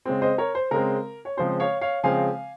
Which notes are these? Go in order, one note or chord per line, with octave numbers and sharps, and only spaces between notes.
C#3 G#3 C4
C5 D#5
A#4 C#5
C5
C#3 G#3 C4 A#4
C#5
C#3 F3 G#3 C4 C5
C#5 F5
C#5 F5
C#3 F3 G#3 C4 F5 G#5